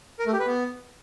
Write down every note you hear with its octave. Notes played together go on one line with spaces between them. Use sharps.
A#4
A3
G4
B4
B3